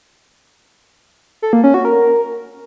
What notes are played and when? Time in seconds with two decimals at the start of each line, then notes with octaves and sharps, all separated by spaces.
1.42 A4
1.53 A#3
1.64 C#4
1.74 F#4
1.85 A#4